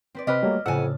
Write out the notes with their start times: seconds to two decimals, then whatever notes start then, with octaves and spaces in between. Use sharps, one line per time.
0.15 C4 B4 D5
0.27 C3 C4 B4 D#5 D6 F6 B6
0.43 F#3 G3 A3 A#3
0.66 F2 A2 C#3 F#5 G#5 A5 E6